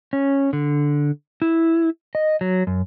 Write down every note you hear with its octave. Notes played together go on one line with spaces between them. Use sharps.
C#4
D3
E4
D#5
F#3
F#2